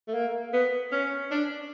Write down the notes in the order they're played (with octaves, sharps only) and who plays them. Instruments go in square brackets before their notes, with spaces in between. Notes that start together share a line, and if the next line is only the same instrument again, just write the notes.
[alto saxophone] A3
A#3
B3
C#4
D4